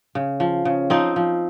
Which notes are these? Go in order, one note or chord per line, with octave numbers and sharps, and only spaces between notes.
C#3
F3
C#3
F3 C4 D#4
F3